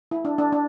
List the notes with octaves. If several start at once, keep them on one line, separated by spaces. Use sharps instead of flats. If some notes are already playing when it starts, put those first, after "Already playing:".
E4
D4
D4
D4